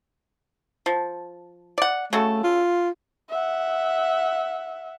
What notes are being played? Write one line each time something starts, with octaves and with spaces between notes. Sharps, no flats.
F3
D5 F#5
C#3 A3 F#4 A4
F4
E5 F#5